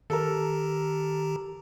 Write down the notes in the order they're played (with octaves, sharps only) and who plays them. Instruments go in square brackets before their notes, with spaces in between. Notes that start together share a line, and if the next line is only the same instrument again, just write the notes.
[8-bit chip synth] D#3 G4 A#5 [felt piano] A4 A#4